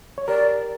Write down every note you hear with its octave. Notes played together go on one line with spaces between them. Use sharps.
C#5
G4 A#4 D5